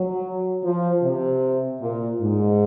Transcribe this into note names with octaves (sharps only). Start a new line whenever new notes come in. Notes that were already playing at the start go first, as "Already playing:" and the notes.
Already playing: F#3
F3
C3
A#2
G#2